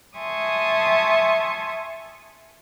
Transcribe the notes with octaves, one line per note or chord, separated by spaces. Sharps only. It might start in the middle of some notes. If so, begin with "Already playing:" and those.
E5 G#5 A5 C6 C#6 D#6